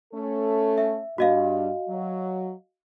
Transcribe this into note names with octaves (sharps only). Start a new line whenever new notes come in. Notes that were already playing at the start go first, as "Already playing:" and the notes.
A3 C#4 A4
E5
G2 F#4 D#5 F5
F#3